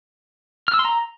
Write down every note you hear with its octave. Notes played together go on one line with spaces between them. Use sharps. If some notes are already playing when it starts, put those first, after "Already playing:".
F6
E6
C6
A#5